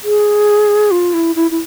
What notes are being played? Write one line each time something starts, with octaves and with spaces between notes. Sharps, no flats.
G#4
F4
E4
E4
E4